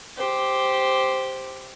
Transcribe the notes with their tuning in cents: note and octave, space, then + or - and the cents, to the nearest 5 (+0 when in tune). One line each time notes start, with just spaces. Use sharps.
G4 +0 C5 +0